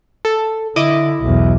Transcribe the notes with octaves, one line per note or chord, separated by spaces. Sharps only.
A4
D3 E4 D#5 D6
B1 E2